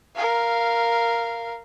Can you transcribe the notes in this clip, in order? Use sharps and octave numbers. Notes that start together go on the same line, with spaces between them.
A#4 F5